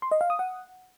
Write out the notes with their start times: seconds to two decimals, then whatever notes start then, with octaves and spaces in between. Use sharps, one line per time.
0.02 C6
0.11 D#5
0.21 F5
0.30 D#6
0.39 F#5